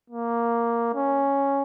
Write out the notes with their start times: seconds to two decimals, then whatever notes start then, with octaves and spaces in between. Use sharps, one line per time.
0.10 A#3
0.95 C#4